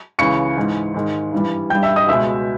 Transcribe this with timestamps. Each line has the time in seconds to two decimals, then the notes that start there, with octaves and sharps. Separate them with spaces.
0.19 C#2 C#3 E3 C#6 C#7
0.56 G#2 E3 G#3
0.94 G#2 D#3 G#3
1.32 G2 E3 G3
1.70 G2 G3 G5 G6
1.83 E5 E6
1.96 D#5 D#6
2.08 C#2 B2 G#3 E5 E6